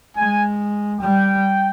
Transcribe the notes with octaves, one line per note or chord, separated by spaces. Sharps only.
G#3 G#5
G3 G5